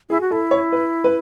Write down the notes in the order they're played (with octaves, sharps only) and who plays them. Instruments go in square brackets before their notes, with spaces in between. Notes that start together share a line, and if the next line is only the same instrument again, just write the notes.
[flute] E4 [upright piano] G#4
[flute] F#4
[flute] E4 [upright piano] A4
[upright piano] C#5
B4
B4